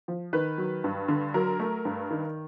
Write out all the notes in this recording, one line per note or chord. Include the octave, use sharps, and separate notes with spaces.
F3
D#3 B4
F#3
G2
D3
F#3 A#4
A3
G2
D#3